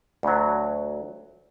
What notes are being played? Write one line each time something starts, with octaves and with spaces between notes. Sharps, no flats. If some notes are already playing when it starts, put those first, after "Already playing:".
D2 F#3